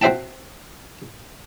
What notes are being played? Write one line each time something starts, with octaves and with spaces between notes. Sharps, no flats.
C4 F#4 C5 E5 G5 A5